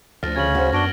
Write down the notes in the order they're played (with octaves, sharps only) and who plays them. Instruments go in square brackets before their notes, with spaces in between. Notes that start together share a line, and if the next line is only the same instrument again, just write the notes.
[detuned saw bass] D2 [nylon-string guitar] F3 [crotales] F6 A6 A#6
[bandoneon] C#3 C#4 [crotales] G#6 F#7
[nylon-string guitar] F#4 C5
[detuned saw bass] F#2 [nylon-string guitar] B3 [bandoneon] D4 F#4 [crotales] A#6 D7 G7